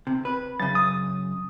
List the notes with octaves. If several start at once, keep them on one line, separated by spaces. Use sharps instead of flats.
C3
B4
F#2 C#3 A6
D#6